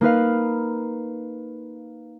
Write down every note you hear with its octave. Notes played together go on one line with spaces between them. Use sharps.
A#3 D#4 B4 F5